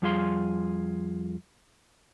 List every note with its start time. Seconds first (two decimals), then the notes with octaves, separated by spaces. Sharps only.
0.02 F2 G3 F4 G#4 F5 C6